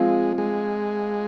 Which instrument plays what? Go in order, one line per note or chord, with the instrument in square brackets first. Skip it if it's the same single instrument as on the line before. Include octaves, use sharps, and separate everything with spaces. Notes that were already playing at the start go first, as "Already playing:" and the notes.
Already playing: [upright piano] F3 C4 F4 [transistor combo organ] G#3
[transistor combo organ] G#3